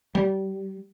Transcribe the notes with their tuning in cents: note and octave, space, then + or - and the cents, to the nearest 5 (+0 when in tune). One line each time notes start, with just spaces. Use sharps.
G3 -25